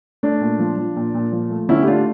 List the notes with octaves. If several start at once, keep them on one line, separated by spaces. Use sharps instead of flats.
A3 D4
A#2
F3
F3
A#2
A#2
F3
A3
D3 C#4 E4
G4
A3 D4 F4